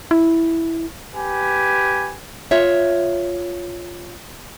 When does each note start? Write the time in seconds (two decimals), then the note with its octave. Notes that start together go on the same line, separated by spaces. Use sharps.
0.11 E4
1.15 G4 B4 G#5
2.51 F4 C#5 E5